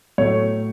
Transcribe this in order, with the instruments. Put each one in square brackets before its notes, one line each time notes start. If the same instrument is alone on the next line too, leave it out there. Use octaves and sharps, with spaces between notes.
[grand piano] A2 F#3 A3 C#5